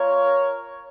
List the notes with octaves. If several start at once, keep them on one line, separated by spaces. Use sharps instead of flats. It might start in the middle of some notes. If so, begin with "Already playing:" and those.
Already playing: A#3 F4 A#4 C#5